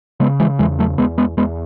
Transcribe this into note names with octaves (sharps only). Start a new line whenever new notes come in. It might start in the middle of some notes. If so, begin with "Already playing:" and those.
C#3 G#3 B3
E3 G#3
E2 E3 G#3
F#3 A3
E2 G#3 B3
G#3 B3
E2 G#3 B3